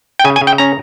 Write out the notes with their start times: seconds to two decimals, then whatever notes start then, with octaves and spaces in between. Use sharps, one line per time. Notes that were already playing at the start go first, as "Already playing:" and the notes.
0.19 G5
0.24 C#3 G#5
0.36 G#5
0.41 C#3
0.47 G5
0.58 C#4 A#5